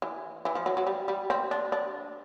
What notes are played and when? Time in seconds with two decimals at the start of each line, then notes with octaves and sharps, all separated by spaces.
0.02 E3
0.45 E3
0.55 F3
0.66 F#3
0.77 F#3
0.87 G3
1.08 G3
1.30 C4
1.51 D4
1.72 D4